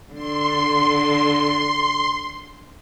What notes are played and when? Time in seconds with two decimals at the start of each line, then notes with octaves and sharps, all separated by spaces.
0.13 D3 C6